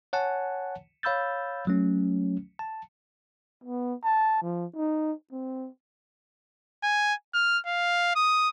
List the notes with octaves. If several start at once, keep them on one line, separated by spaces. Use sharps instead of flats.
C#5 F#5 G#5 A5
C#5 F5 B5 E6 G6 A6
F#3 A3 C#4
A5
B3
A5
F3
D#4
C4
G#5
F6
F5
D#6